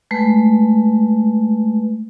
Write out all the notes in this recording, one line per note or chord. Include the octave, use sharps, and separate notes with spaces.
G#3 A3 B4